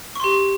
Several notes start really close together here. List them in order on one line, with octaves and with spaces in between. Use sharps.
C#6 C6 G4